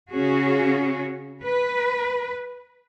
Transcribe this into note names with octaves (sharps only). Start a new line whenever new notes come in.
C#3 C#4 F#4 G#4
B4